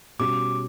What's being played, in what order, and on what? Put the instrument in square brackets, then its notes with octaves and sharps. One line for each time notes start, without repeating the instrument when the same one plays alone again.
[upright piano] B2 G3 C#4 F#4 [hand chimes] D6